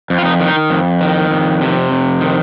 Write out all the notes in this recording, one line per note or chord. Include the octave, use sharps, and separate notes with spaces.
F2
F4
D#4
D#3
D#4
F2
D#3
F2
C3
F2
D#3